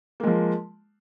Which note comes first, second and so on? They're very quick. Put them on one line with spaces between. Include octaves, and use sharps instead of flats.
A#3 G#3 F3